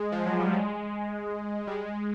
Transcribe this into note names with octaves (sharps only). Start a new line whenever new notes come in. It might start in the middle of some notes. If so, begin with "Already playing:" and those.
Already playing: G#3
F3
F#3
G3
G#3
G3
G#3